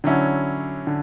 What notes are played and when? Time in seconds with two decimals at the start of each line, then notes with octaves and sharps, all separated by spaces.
0.04 D3 F#3 C#4 E4
0.87 D3